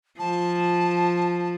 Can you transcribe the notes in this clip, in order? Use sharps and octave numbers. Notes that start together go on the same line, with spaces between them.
F3 A5